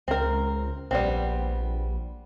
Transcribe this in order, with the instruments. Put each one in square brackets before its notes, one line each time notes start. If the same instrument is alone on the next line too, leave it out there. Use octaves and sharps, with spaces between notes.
[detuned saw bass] C#2 [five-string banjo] C4 A#4
[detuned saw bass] A#1 [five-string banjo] G3 B3 C4